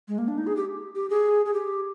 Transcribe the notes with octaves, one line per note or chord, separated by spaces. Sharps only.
G#3
A#3
D4
D#4
G#4
G4
G4
G#4
G#4
G4